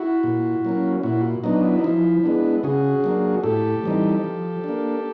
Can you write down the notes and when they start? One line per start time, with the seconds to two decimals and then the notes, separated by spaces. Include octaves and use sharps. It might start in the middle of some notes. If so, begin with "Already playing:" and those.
Already playing: E4 F#4
0.23 A#2
0.65 F#3 A#3 C#4
1.03 A#2 E4 F#4
1.44 F#3 B3 D4 D#4
1.64 E4
1.79 D#4
1.84 F3 E4
2.23 G#3 B3 D4
2.63 C#3 F#4 G#4
3.04 F#3 A#3 D4
3.43 A2 G4 A4
3.83 E3 G3 C4 D#4
4.24 F3
4.64 A#3 D4